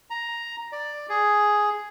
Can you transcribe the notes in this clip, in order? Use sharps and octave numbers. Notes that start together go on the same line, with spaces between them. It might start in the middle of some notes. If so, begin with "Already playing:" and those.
A#5
D5
G#4